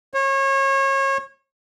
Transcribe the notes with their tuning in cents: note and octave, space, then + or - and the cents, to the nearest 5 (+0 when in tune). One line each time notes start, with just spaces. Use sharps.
C#5 -30